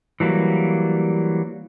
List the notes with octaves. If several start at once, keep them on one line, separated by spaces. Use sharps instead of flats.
E3 F#3 G3 A#3